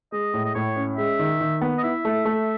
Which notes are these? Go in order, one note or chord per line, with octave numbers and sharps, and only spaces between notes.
G#3 D#5
A2
D#5
A2 C#5
C#4
G#3 E5
D#3
D#3
B3
D#5
E4 E5
A3
A3